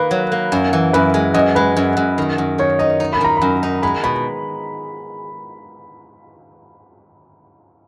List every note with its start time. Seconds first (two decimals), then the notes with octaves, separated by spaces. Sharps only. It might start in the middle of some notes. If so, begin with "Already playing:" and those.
Already playing: D#3 A#3 B4
0.11 F#3
0.32 A#3
0.52 F#2
0.73 E3
0.93 F#2 B4
1.14 G#3
1.34 F#2 D#5
1.55 G#3 B4
1.76 F#2
1.97 F#2
2.18 D#3
2.38 F#2
2.58 D#3 C#5
2.79 D#4 D#5
3.00 D#4
3.13 B5
3.21 D#3 A#5
3.37 F#2 B5
3.63 D#4
3.83 G#3 B5
4.04 B2 B5